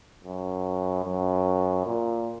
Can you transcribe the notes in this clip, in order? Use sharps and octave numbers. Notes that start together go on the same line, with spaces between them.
F#2
F#2
A#2